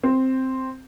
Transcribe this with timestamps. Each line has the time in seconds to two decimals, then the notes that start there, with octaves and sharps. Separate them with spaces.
0.04 C4